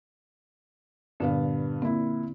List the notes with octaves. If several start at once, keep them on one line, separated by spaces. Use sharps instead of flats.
G2 A#2 D3 B3 F5
A#2 C4 E4